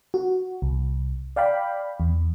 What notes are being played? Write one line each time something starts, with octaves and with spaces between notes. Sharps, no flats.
F#4
C2
D5 F5 G5 B5
E2